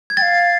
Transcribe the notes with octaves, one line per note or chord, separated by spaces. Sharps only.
G#6
F5 G5 A6